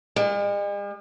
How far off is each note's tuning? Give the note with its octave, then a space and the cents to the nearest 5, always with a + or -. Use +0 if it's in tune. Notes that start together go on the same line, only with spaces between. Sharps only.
G#3 -45